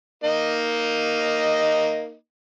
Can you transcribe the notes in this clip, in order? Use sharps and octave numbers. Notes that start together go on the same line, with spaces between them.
A#3 D#4 D#5